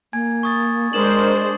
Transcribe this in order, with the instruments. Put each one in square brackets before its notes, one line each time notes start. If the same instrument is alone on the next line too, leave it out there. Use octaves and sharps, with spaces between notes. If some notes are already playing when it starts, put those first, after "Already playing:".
[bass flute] A#3 [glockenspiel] G#5 G#6
[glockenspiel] C#6 D#6 A6
[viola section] G#3 D4 C5 [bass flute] A#4 [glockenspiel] D#6 E7 F#7